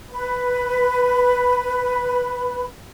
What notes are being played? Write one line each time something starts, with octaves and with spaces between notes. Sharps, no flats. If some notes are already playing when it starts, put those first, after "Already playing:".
B4 B5